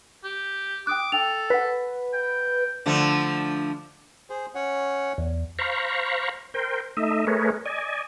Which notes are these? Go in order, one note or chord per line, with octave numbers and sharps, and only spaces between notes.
G4
G5 D6 D#6 F#6
A4 G5 F7
B4 F#5 B6
G5
D3 F3 A3
G#4 C5
C#4 C#5 F#5
E2
C5 F5 A#5 B5 C#6
A#4 C5 G5
A3 D#4 D#5 E5
A3 G#4 A#4 B4 C#5
D5 D#5 G#5